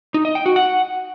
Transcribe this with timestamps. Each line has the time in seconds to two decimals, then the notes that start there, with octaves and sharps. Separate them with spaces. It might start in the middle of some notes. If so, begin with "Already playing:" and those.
0.14 D#4
0.25 D#5
0.35 G5
0.46 F#4
0.56 F#5